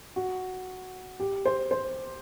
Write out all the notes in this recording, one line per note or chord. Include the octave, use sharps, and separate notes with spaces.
F#4
G4
C5
C5